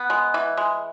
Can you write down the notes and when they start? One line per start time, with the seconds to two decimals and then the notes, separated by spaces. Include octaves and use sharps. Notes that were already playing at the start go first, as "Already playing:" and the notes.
Already playing: B3
0.10 G#3
0.34 E3
0.57 G#3